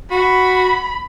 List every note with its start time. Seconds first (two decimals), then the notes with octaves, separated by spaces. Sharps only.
0.11 F#4 B5